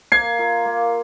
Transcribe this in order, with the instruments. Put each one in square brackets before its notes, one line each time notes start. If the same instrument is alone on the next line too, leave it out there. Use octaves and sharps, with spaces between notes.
[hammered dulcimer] A#3 [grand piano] G#6 C7
[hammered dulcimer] F4 A#4 E5
A#3